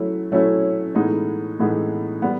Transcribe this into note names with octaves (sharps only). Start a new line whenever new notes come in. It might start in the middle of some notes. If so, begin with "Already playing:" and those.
Already playing: F#3 A3 C#4 E4
F#3 A3 C#4 E4
A2 E3 G#3 B3 D#4
A2 E3 G#3 B3 D#4
G3 B3